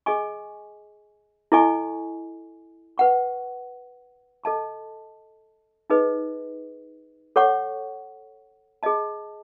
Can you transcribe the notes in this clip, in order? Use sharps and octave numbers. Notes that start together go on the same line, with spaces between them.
G#4 D#5 G#5 C#6
E4 A4 D#5 G#5 C#6
B4 F#5 C#6
A4 D#5 A5 C#6
D#4 G#4 B4 D#5
A4 C#5 F#5 C#6
G#4 D#5 A5